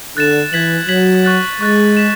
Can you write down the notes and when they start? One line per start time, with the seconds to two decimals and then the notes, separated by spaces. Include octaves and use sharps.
0.16 D3 F#6 A6 E7
0.52 E3 G#6 B6 F#7
0.89 F#3 G#6 B6 F#7
1.25 C#6 F#6 A6
1.61 G#3 C#6 F#6 A6
1.97 B6 E7